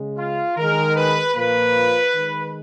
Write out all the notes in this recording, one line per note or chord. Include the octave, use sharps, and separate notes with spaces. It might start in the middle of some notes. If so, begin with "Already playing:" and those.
Already playing: C#3 G#3
F4
D#3 G#3 A#4
B4
A#2 F3 A#3 B4
D#3 G#3